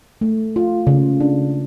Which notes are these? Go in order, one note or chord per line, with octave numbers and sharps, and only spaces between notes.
A3
F4
C#3
D4